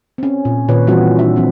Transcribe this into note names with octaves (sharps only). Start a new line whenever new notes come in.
C4 C#4
A#2
A#2 D#3 B4 C#5
E3 G3 C4 F4 F#4
D4 E5
F3 C4